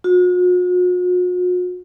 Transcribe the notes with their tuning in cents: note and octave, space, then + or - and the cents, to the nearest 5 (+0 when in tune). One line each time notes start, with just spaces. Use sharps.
F#4 -45